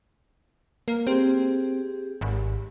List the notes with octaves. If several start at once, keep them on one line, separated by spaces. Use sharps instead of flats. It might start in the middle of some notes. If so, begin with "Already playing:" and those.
A#3
C4 G4 G#4
G#1